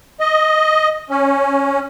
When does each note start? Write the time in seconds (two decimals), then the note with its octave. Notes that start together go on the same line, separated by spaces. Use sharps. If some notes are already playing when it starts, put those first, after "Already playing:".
0.20 D#5
1.10 C#4